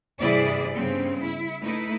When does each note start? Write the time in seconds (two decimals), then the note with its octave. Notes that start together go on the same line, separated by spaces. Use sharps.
0.19 G2 C3 E3 E4 G#4 D5
0.73 G2 C#3 B3 C4
1.22 E4
1.62 A3 D#4 E4 B4